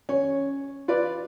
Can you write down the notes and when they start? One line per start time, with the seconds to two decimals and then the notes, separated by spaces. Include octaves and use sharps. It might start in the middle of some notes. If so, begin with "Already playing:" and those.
0.09 C#4
0.88 F4 B4 D5